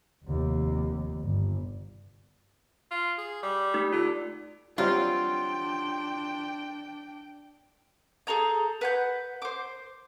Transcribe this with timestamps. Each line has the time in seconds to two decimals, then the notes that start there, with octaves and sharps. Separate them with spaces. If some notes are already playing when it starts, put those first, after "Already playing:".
0.25 F1 D#2
1.22 G1
2.91 F4
3.18 G#4
3.43 G3
3.74 A3 D#4 G4
3.93 D3 F4
4.78 F#3 G3 C4 D4 F4 G5
8.27 G#4 A4 A#5 G6
8.81 B4 F#5 G6
9.42 C5 D6